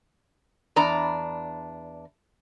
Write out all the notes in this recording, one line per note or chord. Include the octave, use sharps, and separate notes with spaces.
E2 D4 D5 A#5